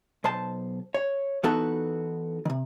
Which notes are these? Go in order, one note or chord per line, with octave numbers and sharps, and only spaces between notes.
B1 C5 A5
C#5
E3 B3 D#4 F#4 A4 B4
C3 D#3